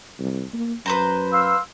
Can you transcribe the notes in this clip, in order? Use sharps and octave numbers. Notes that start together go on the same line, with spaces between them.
C2
A#3
F#2 B4 C5 A#5
F5 C6 E6